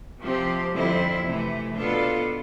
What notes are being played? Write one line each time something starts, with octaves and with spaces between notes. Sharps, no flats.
C3 F3 C4 G4
F2 D3 G3 C4 E4
C3 E3 A3
B2 B3 D4 F4 A4